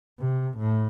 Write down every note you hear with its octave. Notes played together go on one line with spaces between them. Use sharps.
C3
A2